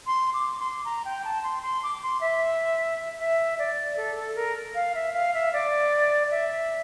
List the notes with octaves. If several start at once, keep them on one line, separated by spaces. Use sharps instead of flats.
C6
D6
C6
A#5
G5
A5
C6
C6
D6
C6
E5
E5
D5
A4
A4
A#4
F5
E5
F5
E5
D5
E5